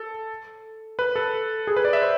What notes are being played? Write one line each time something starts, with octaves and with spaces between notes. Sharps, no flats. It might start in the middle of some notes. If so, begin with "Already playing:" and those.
Already playing: A4
B4
A4
G#4
B4
D5
E5
C5